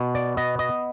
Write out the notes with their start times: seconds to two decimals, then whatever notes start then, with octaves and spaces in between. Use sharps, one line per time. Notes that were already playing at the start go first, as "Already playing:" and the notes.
Already playing: B2
0.15 D5
0.37 B3 D#5
0.59 D#5